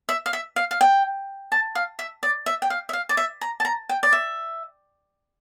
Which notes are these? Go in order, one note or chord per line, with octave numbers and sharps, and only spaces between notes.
E5
F5
E5
F5
F5
G5
A5
F5
E5
D5
E5
G5
F5
E5
F5
D5
E5
A#5
A5
A#5
G5
D5
E5